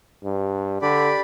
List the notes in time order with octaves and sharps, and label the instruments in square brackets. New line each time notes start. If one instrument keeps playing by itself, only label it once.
[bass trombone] G2
[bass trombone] D3 [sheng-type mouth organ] G4 D5 B5